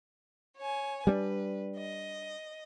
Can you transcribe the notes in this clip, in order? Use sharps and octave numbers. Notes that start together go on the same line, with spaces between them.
C#5 G#5
G3 C4 D4 B4
D#5